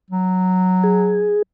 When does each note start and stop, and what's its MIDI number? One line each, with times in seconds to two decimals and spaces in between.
0.11 1.38 54
0.84 1.42 68